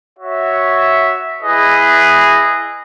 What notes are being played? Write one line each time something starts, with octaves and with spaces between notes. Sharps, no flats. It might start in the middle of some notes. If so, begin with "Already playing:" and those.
F#4 C#5 E5
E4 G#4 B4 D#5